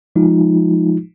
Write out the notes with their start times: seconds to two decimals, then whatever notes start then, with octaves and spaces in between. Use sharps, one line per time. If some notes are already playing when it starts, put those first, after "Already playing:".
0.16 F3 G#3 D#4 F4